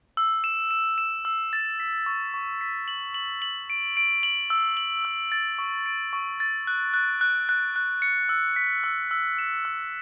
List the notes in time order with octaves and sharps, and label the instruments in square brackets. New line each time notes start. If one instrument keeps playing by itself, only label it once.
[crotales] E6
E7
E7
E7
E6
A6
B6
C#6
C#6
B6
F#7
F#7
F#7
D7
D7
F#7
E6
F#7
E6
A6
C#6
D7
C#6
A6
F#6
F#6
F#6
F#6
F#6
C#7
E6
B6
E6
E6
E7
E6